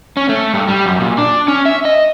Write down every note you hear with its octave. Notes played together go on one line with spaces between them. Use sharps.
C#4
A3
G2
G3
F#2
A#2
D4
C#4
E5
D#5